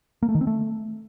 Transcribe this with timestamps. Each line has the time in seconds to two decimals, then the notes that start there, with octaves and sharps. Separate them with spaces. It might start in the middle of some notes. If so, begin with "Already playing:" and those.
0.23 A#3
0.29 A3
0.35 D#3
0.41 C4
0.47 A3